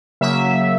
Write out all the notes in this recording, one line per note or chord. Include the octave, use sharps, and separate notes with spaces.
C#3 F#3 A#3 E5